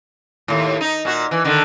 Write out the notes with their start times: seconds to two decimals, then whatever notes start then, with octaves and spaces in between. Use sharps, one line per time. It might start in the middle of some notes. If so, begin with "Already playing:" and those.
0.48 D#2 A2
0.81 D#4
1.05 A#2 F#4
1.31 E3
1.45 D3 D#3